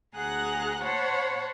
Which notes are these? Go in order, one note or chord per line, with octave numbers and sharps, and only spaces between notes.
D2 G#4 F#5 A#5 F#6
C5 C#5 F#5 A5 B5